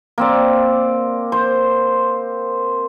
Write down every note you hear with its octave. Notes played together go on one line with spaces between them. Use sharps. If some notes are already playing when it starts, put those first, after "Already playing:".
A#3 C4 D5
C5